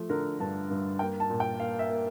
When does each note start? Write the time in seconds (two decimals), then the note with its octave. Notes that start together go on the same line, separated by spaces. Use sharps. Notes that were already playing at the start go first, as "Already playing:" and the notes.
Already playing: F3 A3
0.09 D3 A#4
0.40 G2 A5
0.70 G2
0.99 A#3 G5
1.20 A5
1.30 A#2
1.40 G5
1.60 A#3 F5
1.79 E5
1.90 A#3